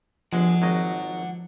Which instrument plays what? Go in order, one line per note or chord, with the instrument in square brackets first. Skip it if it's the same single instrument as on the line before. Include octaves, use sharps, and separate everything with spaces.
[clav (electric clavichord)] G1 G#3 [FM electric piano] F3 [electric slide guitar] D5 F#5
[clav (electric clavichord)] G#1 F#3 D#5